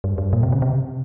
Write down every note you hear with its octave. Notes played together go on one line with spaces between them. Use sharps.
G2
G2
A#2
C3
C#3
C3